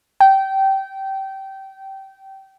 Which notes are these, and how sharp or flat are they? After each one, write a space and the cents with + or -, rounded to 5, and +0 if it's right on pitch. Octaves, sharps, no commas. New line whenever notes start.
G5 -20